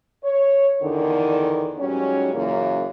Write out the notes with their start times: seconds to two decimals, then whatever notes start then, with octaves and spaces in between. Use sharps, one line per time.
0.24 C#5
0.82 E2 D3 D#3
1.79 G#2 F#3 G3 C#4
2.33 F#2 A#2 C#3 E3 A#3